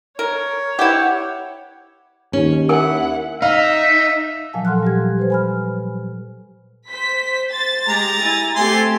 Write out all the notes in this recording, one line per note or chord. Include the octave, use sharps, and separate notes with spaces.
A#4 C#5
E4 G4 F#5
D#2 C#4
E4 A#4 F#5 G#5
D#4 E5 F5
A#2 F3 F#3 F5 G#5 A5
A4 F#5 C6 F6 F#6
G3 G4 G#6
B4 C5
G#5 B5 F6
C5 B6
A6
G#3 G4 A#5
E4 G#5
A3 C4 G4 G#5 C6